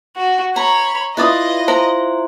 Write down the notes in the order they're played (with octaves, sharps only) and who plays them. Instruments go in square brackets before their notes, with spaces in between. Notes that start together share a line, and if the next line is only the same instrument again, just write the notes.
[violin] F#4
[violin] C#5 B5 [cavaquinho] A#5
[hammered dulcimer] E4 F4 F5 [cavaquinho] B4 D5 D#6 [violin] D#5
[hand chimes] C5 [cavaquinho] A#5